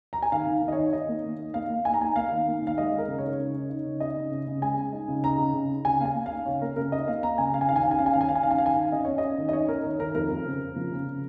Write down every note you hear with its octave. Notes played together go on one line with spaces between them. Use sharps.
A#5
G#5
D#3 F5
D#3
D#3
D#5
C#5
D#4
D#4 D#5
A#3
D#3
D#4
A#3 F5
A#3
D#4 G#5
A#5
A#3 G#5
A#3 F5
D#3
A#3
D#3 F5
G#3 D#5
G#3
A#4
C#3
C#5
D#4
C#3
D#4
D#4
C#3
D#4 D#5
C#3
C#3
C#3
G#3 G#5
G#3
D#4
C#3
D#4 A#5
C#3
C#3
D#4
C#3 G#5
A#3 F5
G#5
A#3
D#4 F5
C#3 C#5
A#3 A#4
C#3 A#4
D#4 D#5
A#3 F5
A#3 A#5
C#3 G#5
C#3 F5
G#5
D#3 F5
G#5
C#4 F5
G#5
C#4 F5
G#5
D#3 F5
G#5
D#3 F5
G#5
F5
C#4 G#5
F5
D#3 G#5
D#3 F5
C#4 D#5
C#4 C#5
C#4 D#5
D#3
D#5
C#4 C#5
D#3 A#4
D#3 C#5
D#3 A#4
F2 A#4
F2
C#3
C#3
F3
C#3
C#3